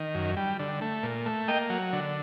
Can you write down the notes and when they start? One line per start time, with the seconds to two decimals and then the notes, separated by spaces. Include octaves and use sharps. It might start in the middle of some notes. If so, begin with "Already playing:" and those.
Already playing: D#3
0.14 F#2
0.37 G3
0.59 D3
0.81 A3
1.03 A#2
1.26 A3
1.48 A#3 D#5 G5
1.70 F#3
1.93 D3